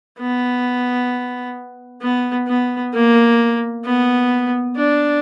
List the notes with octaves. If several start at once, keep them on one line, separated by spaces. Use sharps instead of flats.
B3
B3
B3
A#3
B3
D4